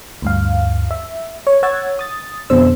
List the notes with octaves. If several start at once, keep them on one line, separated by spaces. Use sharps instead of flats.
D2 G2 F5
E5
C#5
C#5 F#5 E6 G#6 A6
D#6 A6
F2 B2 D3 C5 E6